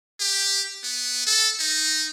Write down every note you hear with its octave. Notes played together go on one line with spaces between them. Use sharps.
G4
B3
A4
D#4